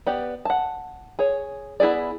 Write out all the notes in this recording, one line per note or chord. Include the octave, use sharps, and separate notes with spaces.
B3 G4 D5
F#5 A5
G#4 C#5
B3 E4 F#4 G#4 D5